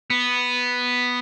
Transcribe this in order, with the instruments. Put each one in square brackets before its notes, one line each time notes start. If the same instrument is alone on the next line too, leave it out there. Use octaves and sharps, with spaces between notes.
[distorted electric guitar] B3